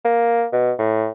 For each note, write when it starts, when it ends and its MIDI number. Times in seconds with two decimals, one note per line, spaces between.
0.04 0.45 58
0.53 0.72 47
0.79 1.10 45